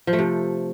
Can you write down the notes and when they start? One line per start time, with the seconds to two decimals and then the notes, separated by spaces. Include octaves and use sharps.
0.07 F3
0.13 A3
0.19 C3